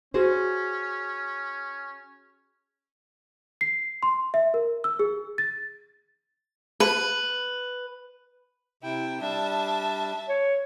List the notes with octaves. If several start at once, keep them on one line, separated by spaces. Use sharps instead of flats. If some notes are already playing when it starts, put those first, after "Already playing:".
C#4 F#4 G#4 C5
C7
C6
E5
A#4
E6
G#4
A6
B4
C3 E4 G5
G3 D4 E5 A5
C#5